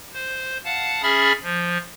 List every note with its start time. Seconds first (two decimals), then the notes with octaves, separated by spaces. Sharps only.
0.14 C5
0.65 F5 F#5 A5
1.02 C#4 G#4 E5 B5 F6 A6
1.43 F3